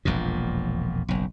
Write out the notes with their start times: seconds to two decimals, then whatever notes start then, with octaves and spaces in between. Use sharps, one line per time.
0.05 E1 A#1 F2 A#2
1.09 F#1 B1